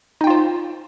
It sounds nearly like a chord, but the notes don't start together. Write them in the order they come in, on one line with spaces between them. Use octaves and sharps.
D#4 G5 F4 C5